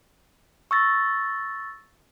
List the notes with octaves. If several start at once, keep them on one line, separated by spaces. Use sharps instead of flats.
C#6 E6 A6 A#6